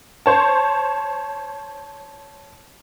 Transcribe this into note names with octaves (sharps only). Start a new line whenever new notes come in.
C5 C#5 A5